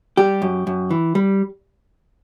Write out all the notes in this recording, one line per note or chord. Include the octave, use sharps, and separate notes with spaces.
G3 G4
F#2
F#2
E3
G3